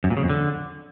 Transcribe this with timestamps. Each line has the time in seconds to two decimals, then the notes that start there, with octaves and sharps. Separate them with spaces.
0.04 F#2
0.10 A#2
0.17 C#3
0.23 F2
0.29 D3